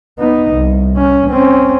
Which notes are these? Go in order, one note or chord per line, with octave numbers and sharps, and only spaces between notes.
B3 D#4
C2
C#4
C4 C#4